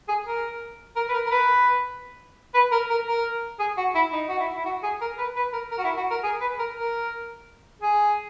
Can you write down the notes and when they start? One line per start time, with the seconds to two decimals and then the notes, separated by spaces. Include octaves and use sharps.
0.08 G#4
0.26 A#4
0.96 A#4
1.09 B4
1.14 A#4
1.26 A#4
1.31 B4
2.54 B4
2.72 A#4
2.90 A#4
3.08 A#4
3.59 G#4
3.77 F#4
3.95 E4
4.13 D#4
4.29 F#4
4.39 E4
4.57 E4
4.65 F#4
4.83 G#4
5.01 A#4
5.18 B4
5.36 B4
5.53 A#4
5.71 A#4
5.78 F#4
5.84 E4
5.97 F#4
6.10 A#4
6.24 G#4
6.41 B4
6.59 A#4
6.77 A#4
7.82 G#4